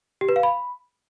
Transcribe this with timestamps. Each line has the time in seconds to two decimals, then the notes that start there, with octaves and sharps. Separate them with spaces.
0.21 G4
0.29 B4
0.36 F5
0.43 B5